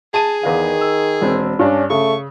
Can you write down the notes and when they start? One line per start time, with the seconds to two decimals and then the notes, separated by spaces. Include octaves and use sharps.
0.14 G#4 A5 D#7
0.43 E2 D#3 B4 F5
0.81 E6
1.21 E1 C4
1.59 G2 C#4 D4
1.90 C#3 A3 C#6